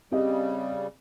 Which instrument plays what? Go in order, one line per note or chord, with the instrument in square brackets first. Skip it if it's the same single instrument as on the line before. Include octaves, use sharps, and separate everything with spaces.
[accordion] C#3 G3 [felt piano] C4 G4 D#5